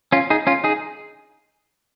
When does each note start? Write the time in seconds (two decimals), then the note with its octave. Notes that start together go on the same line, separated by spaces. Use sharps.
0.12 C#4 F4
0.30 D#4 G#4
0.47 C#4 F4
0.64 D#4 G#4